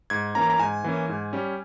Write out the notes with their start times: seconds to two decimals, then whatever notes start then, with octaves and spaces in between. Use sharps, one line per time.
0.10 G#2 G#6
0.35 E3 A#3 C#4 A#5
0.50 A#5
0.59 G#2 G#5
0.84 E3 A#3 C#4
1.09 G#2
1.33 G3 C#4